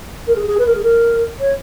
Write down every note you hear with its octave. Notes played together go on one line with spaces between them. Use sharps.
A#4
G#4
G#4
B4
A#4
G#4
A#4
C#5